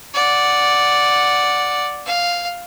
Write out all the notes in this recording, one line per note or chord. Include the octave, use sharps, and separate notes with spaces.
D5 F#5
F5